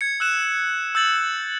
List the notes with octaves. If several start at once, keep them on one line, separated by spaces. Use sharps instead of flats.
G#6 C#7
E6 F#6 E7
E6 G6 A6 F#7